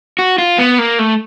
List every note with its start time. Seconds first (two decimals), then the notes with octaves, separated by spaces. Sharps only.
0.19 F#4
0.38 F4
0.59 B3
0.79 A#3
0.99 A3